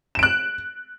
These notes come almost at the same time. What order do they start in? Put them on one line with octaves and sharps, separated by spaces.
E7 D7 F#6